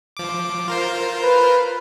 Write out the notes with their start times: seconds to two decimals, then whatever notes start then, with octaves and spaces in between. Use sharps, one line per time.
0.17 F3 D6
0.68 F4 A#4 C5
1.23 B4